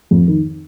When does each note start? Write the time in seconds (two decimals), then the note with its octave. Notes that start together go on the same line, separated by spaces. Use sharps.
0.11 F2
0.28 D#3